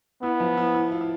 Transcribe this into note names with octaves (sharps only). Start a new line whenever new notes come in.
B3 E4
F3 F4
E4
E4
F4
E4